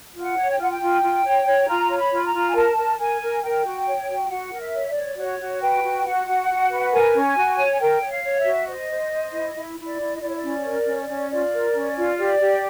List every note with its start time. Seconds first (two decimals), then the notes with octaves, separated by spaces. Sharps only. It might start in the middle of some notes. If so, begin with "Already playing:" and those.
0.15 F4
0.21 F#5
0.36 C#5
0.50 G5
0.58 F4 F#5
0.71 G5
0.79 F4
1.02 F4
1.24 C#5
1.45 C#5
1.67 F4 A#5
1.89 C#5
1.97 B5
2.12 F4
2.25 A#5
2.33 F4
2.48 G#5
2.55 A#4 A5
2.77 A#4
2.99 A#4 G#5
3.21 A#4
3.43 A#4 G5
3.65 F#4
3.87 C#5
4.08 F#4
4.30 F#4 F#5
4.52 A#4
4.59 E5
4.74 C#5
4.88 D5
4.96 C#5
5.17 F#4 C#5
5.40 F#4
5.61 B4 G5
5.83 F#4
6.05 F#4 F#5
6.27 F#4
6.49 F#4
6.70 B4
6.92 A#4 G#5
7.15 C#4
7.37 F#4
7.58 C#5
7.80 A#4 G5
8.01 C#5
8.10 F5
8.24 C#5
8.38 E5
8.46 F#4
8.68 C5 D#5
8.89 C5
9.11 C5
9.33 E4
9.55 E4
9.77 E4
9.84 D5
9.99 E4
10.13 D#5
10.21 E4 D5
10.28 C#5
10.35 D5
10.43 C#4
10.64 A#4
10.86 C#4
11.08 C#4
11.30 F4 D5
11.52 A#4
11.74 C#4
11.96 F4
12.18 G4 D5
12.40 G4